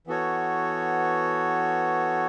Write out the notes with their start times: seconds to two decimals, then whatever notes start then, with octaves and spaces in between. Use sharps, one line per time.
0.07 E3 B3 F#4 A4 C#5